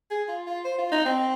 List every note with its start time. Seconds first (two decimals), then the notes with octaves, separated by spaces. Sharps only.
0.11 G#4
0.29 F4
0.47 F4
0.65 C5
0.78 F4
0.92 D#4
1.05 C4